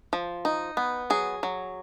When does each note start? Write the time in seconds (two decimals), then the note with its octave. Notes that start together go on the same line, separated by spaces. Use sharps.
0.13 F3
0.45 D#4
0.77 B3
1.10 F#3 G#4
1.43 F#3